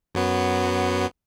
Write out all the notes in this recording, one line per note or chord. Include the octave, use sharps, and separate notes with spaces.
F#2 F#3 B3